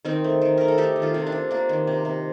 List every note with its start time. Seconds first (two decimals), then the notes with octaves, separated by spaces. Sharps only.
0.05 D#3 C4 D#4
0.24 A3
0.42 D#3
0.58 A3 A#4
0.68 A4
0.78 A3 D#4 G4
0.96 D#3
1.02 F4 A4
1.14 C3
1.27 D4
1.32 C3
1.51 A#3 D4
1.69 D#3
1.87 C3
2.05 C3